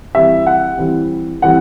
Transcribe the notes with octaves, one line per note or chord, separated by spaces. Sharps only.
E3 G3 C4 E5
F#5
E3 G3 C4
E3 G3 C4 F#5